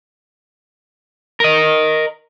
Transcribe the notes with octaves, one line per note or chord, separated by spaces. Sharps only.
A#4 D#5